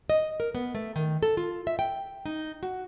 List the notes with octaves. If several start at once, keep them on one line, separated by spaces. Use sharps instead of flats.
D#5
A#4
B3
A3
D#3
A4
F4
E5
G5
D#4
F#4